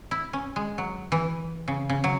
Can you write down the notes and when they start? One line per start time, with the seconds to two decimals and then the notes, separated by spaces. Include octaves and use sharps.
0.11 E4
0.33 C#4
0.56 G#3
0.78 F#3
1.12 E3
1.68 C#3
1.89 C#3
2.04 F#3